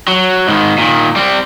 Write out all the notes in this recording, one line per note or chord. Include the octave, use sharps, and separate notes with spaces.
F#3
G#2 D#3
A#2 D#3
G3 C4